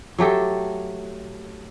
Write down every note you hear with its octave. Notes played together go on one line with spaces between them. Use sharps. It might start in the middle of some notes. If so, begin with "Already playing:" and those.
F#3 A3 G4 A4